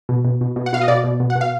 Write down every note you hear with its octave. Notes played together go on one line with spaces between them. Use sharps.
B2
B2
B2
B2
F#5
B2 F5
D#5
B2 D5
B2
B2
F#5
B2
F5